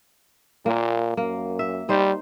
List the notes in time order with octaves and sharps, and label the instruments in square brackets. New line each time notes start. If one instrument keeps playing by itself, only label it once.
[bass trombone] A#2 [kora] A#3
[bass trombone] F#2 [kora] A#3
[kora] E5
[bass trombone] G3 [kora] D#4 C5